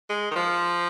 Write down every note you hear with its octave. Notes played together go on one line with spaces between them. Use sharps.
G#3
D#3
F3